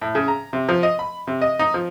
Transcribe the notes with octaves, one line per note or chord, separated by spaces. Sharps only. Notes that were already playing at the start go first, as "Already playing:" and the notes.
A2
C#3
A#5
C3
F3
D#5
B5
C3
D#5
D#4
F3